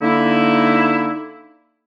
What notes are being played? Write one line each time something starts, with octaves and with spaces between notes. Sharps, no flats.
D3 A#3 D#4 E4